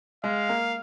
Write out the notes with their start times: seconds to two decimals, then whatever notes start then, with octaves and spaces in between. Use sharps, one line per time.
0.24 G#3 F5
0.49 A#3